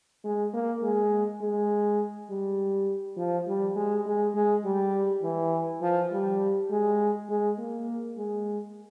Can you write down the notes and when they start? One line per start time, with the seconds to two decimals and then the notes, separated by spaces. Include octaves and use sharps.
0.24 G#3
0.53 A#3
0.82 G#3
1.41 G#3
2.30 G3
3.17 F3
3.47 G3
3.75 G#3
4.06 G#3
4.34 G#3
4.64 G3
5.22 E3
5.81 F3
6.12 G3
6.70 G#3
7.29 G#3
7.58 A#3
8.17 G#3